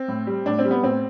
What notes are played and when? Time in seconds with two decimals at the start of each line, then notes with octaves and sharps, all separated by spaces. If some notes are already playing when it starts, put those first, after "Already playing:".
Already playing: C4
0.08 A2
0.27 G3
0.46 A2 D4
0.59 C4
0.65 G3
0.71 B3
0.83 A2 C4